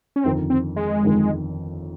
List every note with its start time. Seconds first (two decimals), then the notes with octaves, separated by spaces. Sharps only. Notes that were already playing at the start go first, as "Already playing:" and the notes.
0.16 C#4
0.24 G1 F2 D#3 C4
0.50 C4
0.76 G#3
1.02 G1 F2 D#3